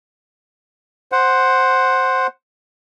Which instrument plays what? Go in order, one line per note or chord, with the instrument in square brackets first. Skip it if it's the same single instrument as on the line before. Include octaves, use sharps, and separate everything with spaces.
[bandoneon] C5 F#5